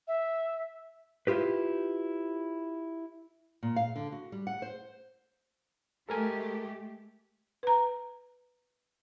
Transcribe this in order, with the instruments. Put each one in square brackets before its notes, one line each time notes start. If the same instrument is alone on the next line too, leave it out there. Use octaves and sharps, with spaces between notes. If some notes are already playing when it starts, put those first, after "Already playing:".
[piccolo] E5
[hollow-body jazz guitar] E4 F4 G4 B4
[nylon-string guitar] A#2
F5
D3
F#4
G3
F#5
C5
[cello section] G#3 A3 G4 [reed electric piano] A4 A#4 G#5
[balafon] B4 A#5